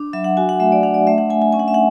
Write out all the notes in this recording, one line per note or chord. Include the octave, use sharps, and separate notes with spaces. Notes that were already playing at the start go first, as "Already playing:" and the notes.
Already playing: D4
F#3 E5
F#5
F#4 G#5
F#5
A3 E5
D5
D4 F#5
D5
A3 E5
F#5
A3 G#5
G#5
C#4 G#5
F#5
E5
F#5